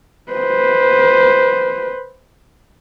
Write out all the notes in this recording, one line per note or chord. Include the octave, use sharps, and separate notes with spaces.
B4 C5